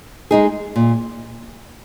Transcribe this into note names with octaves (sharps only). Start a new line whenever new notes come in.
G#3 D#4 G#4
A#2